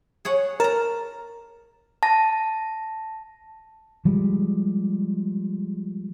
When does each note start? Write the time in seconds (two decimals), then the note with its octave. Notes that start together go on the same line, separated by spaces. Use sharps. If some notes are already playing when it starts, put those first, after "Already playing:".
0.25 G#4 C#5 F#5
0.60 A#4 A5 A#5
2.03 A5 A#6
4.05 F3 G3 G#3